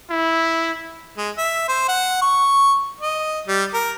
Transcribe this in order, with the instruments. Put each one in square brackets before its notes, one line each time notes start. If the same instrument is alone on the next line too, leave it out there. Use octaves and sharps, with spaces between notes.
[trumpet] E4
[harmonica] G#3
E5
C5
F#5
C#6
D#5
G3
A#4